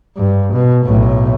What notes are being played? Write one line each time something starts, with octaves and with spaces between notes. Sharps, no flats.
G2
B2
B1 A2